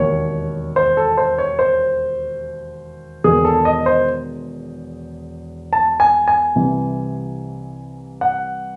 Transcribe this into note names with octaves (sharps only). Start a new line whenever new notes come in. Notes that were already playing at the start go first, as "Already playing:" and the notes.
Already playing: E1 D#2 D#3 C#5
C5
A4
C5
C#5
C5
E1 E2 D#3 G#4
A4
D#5
C5
A5
G#5
G#5
C2 C3 E3
F#5